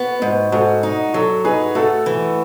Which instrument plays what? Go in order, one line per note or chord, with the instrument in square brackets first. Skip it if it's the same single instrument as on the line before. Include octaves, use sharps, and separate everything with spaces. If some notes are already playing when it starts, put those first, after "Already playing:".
Already playing: [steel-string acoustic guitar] B3 [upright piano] F#4
[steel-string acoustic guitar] G#2
[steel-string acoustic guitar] G#2 [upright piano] F#4 A4
[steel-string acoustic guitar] D#4
[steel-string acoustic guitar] F#3 [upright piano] F#4 A4
[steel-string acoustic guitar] D#4 [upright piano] G#4 B4
[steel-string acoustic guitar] A3 [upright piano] F#4 A4
[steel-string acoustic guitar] E3